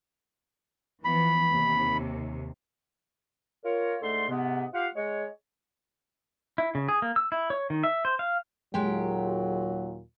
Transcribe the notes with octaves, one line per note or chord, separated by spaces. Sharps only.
E3 F3 B3 B5
D#2 C3
F4 A#4 C#5
G#2 D3 A3 A4 C6
G#2 C3 B3
F4 G4 F5 F#5
G#3 C#5
E4
C#3
G#4
A#3
E6
E4
C#5
D#3
E5
C5
F5
D#2 A#2 F#3 G#3 G4 G5